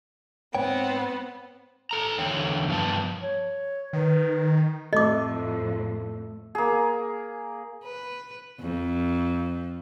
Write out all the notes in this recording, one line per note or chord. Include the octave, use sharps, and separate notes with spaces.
G#2 B3 C4 C#5 G5
A4 A#5
E2 D3 C#5 G5
G2 F3 B3 A5
C#5
D#3 B4
F2 A2 A3 A4 D#5 D6
A#3 G#4
B4
F2